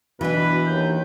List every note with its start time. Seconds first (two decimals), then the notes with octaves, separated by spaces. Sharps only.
0.21 B2 E3 D4 B4
0.67 D#2 G6